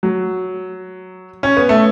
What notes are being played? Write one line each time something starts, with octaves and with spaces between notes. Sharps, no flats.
F#3
C#4
B3
A3